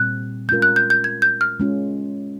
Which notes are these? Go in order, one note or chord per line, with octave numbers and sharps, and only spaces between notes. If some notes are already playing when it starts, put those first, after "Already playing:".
Already playing: A#2 G3 C4 F#6
G#3 C#4 F4 A#4 G6
F#6
G6
G6
G#6
G6
F6
G#3 C#4 F4